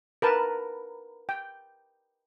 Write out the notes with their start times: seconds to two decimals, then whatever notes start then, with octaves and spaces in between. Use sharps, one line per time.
0.22 A#4 B4 A5
1.29 G5